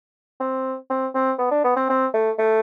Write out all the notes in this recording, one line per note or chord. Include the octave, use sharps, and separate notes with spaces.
C4
C4
C4
B3
D4
B3
C4
C4
A3
A3